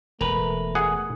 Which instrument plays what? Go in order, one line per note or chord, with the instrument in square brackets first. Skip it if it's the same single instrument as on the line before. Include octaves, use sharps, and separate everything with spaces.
[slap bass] E1 [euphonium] A3 [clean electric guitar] A#4 B4
[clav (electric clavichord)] G#4 F#5